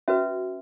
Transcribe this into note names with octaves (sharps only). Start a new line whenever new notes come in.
C#4 F#4 B4 E5